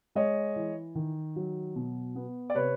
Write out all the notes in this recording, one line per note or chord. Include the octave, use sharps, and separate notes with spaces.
G#3 C#5 D#5
E3
D#3
F#3
B2
B3
D5
C3 B4 C#5